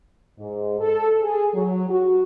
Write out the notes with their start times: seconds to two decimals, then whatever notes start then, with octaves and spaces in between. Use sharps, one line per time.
0.39 G#2
0.80 A4
1.23 G#4
1.55 F#3
1.90 F#4